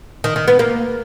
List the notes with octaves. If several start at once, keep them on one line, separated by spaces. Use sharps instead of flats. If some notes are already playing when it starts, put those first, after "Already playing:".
D#3
D#3
B3
A#3